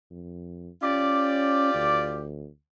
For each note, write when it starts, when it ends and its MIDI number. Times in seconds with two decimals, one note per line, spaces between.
0.10 0.69 41
0.82 1.74 61
0.82 2.25 65
0.82 2.25 67
0.82 2.25 74
1.75 2.47 38